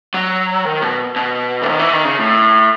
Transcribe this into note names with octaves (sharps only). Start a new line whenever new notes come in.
F#3
D#3
B2
B2
E3
D#3
E3
D#3
C#3
A2